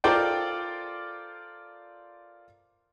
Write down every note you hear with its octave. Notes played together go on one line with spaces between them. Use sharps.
F4 A4 A#4 C5 D5 G5